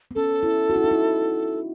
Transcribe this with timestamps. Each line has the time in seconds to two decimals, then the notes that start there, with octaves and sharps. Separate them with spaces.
0.11 B3
0.15 C#4 A4
0.43 E4
0.70 F#4
0.76 E4
0.84 D#4
0.91 E4